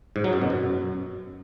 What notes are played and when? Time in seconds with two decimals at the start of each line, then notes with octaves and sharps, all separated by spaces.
0.16 G#2
0.24 F#3
0.33 F#2
0.42 B2
0.50 F#2